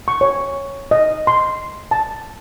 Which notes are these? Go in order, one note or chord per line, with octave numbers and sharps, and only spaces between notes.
C#6
C#5
D#5
C6
A5